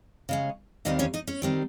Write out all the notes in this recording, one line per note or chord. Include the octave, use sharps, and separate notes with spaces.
C#3 G#3 C#4
D#2 D#3 G3 C4 D#4 D#5
C#4 C#5
D#4 D#5
C#4 C#5
D#3 G3 C4